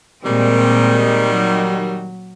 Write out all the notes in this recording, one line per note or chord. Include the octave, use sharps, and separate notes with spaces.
A#2 D#3 G3 G#3 C4
F#3